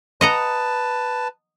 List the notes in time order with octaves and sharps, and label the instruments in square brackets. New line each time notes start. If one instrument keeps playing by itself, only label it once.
[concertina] B4 A5 [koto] D#5 F#5 A#5